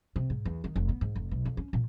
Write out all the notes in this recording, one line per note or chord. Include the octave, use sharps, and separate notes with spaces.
C3
G#2
E2
D#3
F1
B3
G#2
F1
B1
F2
C#4
A#2